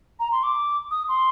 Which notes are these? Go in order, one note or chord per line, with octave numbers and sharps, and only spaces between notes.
A#5
C6
D6
D#6
C6